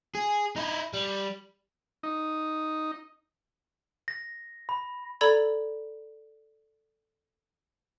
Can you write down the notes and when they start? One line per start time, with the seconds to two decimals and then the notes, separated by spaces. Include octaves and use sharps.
0.15 G#4
0.56 D#4 E4
0.93 G3
2.03 D#4
4.08 A#6
4.69 B5
5.21 A4 D5 A#5 B5 G#6